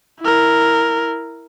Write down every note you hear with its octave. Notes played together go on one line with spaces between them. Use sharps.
E4 A#4